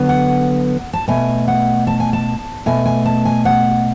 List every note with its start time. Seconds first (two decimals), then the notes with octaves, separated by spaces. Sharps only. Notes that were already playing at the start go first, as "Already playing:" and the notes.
Already playing: D3 F#3 B3
0.09 F#5
0.93 A5
1.08 B2 A3 G#5
1.48 F#5
1.87 A5
2.00 G#5
2.13 A5
2.66 B2 A3 G#5
2.86 G#5
3.06 A5
3.25 G#5
3.45 F#5